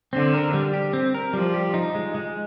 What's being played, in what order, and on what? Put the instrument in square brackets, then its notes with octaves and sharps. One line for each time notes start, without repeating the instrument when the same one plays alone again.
[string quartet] D3 [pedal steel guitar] C4
[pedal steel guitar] A#4
G3
G4
C4
A#4
[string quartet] F3 [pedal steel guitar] G3
[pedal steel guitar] G4
D#4
G#3
G#3